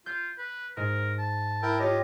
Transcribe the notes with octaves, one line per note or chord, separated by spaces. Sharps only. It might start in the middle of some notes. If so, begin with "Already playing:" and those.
F4 G6
B4
G#2 A#4
A5
E4 A#4 G5
F4 G4 C#5 D#5